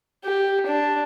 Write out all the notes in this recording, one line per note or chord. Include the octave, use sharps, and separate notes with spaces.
G4
D4